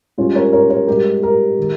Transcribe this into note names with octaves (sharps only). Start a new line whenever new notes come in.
G#2 G3 C#4 F4
A#4 C#5
A#4 C#5
A#4 C#5
G#2 G3 G4 A#4
G4 A#4
D#3 G#3